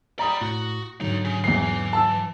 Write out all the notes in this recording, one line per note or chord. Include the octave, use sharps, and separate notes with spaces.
D5 A#5 B5 D#6
A2 F#4
D#2 G#2 D3 F#3 D#4
C#3
E2 E3 C7
A5 E6